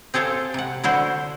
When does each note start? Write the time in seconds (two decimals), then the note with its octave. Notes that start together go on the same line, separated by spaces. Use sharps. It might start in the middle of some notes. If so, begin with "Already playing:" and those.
0.14 C4 G#4 A4 C5 F5
0.54 C3 F#5
0.84 D3 E4 F#4 C5